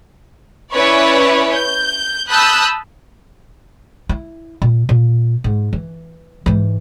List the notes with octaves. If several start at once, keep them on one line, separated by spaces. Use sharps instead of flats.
C#4 E4 B4 C#5 D5
G6
A5 B5 D#6 E6 F#6 G6
E4
A#2
A#2
G#2
E3
G#2 E3